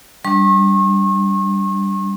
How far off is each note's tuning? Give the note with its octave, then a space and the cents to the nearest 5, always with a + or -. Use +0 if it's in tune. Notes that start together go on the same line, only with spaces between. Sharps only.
G3 +0 D4 -5 C#6 -40